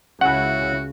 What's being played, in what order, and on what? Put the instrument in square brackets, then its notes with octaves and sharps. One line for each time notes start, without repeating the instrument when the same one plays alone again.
[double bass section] C#2 C#3 [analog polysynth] C#4 E4 [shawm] F#4 [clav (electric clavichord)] F#5